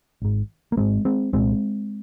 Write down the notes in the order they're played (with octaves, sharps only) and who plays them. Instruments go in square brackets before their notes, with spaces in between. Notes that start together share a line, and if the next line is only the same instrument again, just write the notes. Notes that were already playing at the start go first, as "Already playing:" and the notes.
[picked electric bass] G#1 G#2
A#3
G#1 G#2 G#3 C4
G#3 C4
C2 A#2 G#3 C4